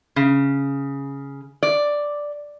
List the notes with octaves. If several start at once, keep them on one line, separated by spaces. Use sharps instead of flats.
C#3
D5